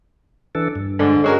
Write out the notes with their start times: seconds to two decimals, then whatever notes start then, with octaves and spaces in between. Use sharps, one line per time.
0.55 E3 D4 A4
0.76 G2
0.99 G#2 D3
1.24 G#3 C#4 F#4 G#4 A#4